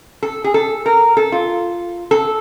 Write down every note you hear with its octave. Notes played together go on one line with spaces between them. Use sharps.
A4
G#4
A4
A#4
A4
F4
A4